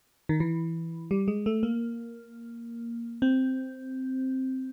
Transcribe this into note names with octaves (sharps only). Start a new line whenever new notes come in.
D#3
E3
G3
G#3
A3
A#3
C4